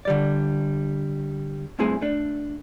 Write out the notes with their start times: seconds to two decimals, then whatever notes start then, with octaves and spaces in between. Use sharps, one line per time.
0.05 D3 G3 D5
1.79 G2 A3 C4 E4 G#4 G#5
2.01 A3 D4